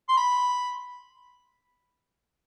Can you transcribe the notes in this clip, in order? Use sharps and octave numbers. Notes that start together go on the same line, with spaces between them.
C6
B5